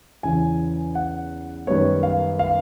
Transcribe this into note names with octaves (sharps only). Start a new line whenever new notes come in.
E2 C#3 E3 G#5
F#5
F#2 D#3 G3 B3 C#5
F5
F5